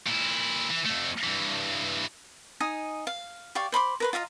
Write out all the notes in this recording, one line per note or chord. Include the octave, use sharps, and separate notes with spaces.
A#2 E4
E3
F2 A3
G2 E3
D#4 G#5 D#6
F5
G4 D5 F5 C#6
C5 B5 C6 D6
A#4 B4 C6
F4 D#5 F5 A#5